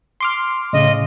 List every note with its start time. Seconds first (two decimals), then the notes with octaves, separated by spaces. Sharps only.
0.20 C6 D6 F6
0.73 A2 C#3 D#5